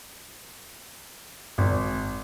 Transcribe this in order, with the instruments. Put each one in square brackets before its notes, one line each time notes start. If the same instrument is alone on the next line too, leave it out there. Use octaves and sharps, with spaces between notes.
[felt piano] G#1